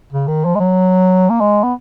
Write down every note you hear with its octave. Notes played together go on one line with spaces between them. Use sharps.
C#3
D#3
F3
G#3
F#3
A#3
G#3
B3